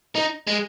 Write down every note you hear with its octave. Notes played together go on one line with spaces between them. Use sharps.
D#4
G#3